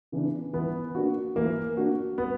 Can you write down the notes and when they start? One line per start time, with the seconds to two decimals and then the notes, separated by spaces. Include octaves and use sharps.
0.12 C#3 E3 B3 D4
0.53 E3 B3
0.95 A#3 D4 F#4
1.36 E3 A#3
1.77 A#3 D4 F#4
2.18 B3